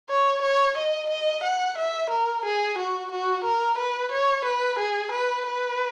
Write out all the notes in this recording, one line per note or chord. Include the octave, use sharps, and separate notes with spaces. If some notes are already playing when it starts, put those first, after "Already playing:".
C#5
C#5
D#5
D#5
F#5
E5
A#4
G#4
F#4
F#4
A#4
B4
C#5
B4
G#4
B4
B4